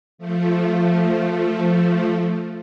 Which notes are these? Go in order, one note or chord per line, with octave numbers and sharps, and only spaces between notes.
F3 A3